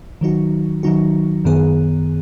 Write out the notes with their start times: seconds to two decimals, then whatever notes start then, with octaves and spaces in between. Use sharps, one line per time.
0.21 D#3 F#3 D#4 F#4
0.83 D#3 F#3 D#4 F#4
1.45 F#2 D#3 B3 G#4